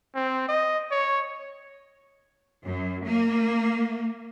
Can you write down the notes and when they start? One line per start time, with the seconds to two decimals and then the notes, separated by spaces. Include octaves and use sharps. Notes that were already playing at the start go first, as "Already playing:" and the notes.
0.15 C4
0.49 D#5
0.91 C#5
2.64 F#2
3.05 A#3